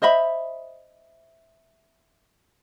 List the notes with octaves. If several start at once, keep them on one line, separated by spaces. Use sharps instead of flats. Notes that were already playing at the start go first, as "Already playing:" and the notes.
C5 D#5 E5 B5